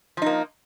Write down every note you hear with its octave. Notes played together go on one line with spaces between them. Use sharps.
F3 A#3 D#4